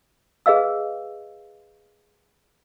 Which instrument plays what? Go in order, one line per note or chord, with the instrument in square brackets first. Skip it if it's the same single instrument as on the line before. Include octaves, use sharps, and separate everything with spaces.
[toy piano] G#4 B4 D#5 F5 E6